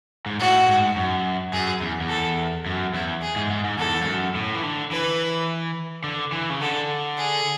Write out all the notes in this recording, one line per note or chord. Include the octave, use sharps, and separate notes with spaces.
G#2
A2 F#4
G#2
F#2
F#2 G#4
E2
E2
A4
F#2
E2 E4
G#4
G#2
G#2
G#2
E2 A4
G#2
F#2
A2
E3
D3
E3 B4
D3
E3
C#3
D3 A4
G#4